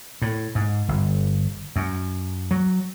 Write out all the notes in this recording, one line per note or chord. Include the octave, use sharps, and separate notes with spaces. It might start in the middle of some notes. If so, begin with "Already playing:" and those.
A2
G#2
G1
F#2
F#3